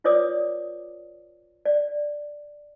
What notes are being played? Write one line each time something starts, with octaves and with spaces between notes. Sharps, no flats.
F4 B4 C#5 D5 D6 D#6
D5